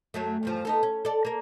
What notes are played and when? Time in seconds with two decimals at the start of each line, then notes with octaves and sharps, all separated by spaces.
0.14 F#2 F#3 A3
0.43 E2 G2 F3
0.65 B3 D#4 A4
0.83 C#4
1.05 A4 D5
1.25 A#3 A#4